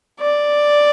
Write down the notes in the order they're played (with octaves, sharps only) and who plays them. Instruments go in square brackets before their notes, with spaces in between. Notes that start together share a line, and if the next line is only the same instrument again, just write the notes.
[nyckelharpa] D5